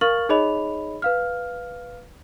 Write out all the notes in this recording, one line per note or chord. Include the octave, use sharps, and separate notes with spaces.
A#4 F5 C#6 F6 A6 F#7
D#4 G#4 C#5 D#5 B5 F7
B4 F5 F6